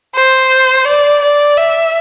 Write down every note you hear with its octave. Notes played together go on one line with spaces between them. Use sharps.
C5
D5
D5
E5